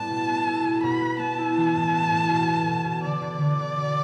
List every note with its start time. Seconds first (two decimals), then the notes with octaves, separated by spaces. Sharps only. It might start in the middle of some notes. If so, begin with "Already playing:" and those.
Already playing: A2 G3 B3 A5
0.10 B2
0.29 B3
0.47 E4
0.65 B2
0.83 B2 B5
1.02 B3
1.19 B3 A5
1.38 E4
1.57 E3
1.76 A2
1.93 B3
2.12 A2
2.31 B2
2.48 B3
2.67 B2
2.85 B2
3.04 D3 D5
3.22 D3
3.40 D3
3.59 D3
3.77 B2